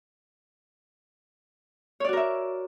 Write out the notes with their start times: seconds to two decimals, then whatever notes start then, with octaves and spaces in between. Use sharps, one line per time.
2.00 C#5
2.04 D5
2.09 F#4
2.13 A#4
2.17 E5